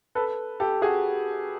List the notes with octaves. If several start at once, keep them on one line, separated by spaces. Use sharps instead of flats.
A4 B4
G4 A4
F#4 G#4